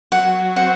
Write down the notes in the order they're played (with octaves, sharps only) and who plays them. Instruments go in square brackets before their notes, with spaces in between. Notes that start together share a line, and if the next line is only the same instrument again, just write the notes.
[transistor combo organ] F#3 [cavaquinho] F#5
[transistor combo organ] C4 [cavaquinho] F#5